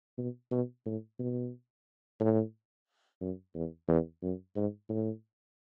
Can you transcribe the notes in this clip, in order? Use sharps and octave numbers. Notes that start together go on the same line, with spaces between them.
B2
B2
A2
B2
A2
F#2
E2
E2
F#2
G#2
A2